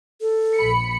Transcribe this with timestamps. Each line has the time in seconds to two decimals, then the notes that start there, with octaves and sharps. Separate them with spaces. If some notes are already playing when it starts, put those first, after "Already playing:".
0.21 A4
0.56 A#1 B5 C#7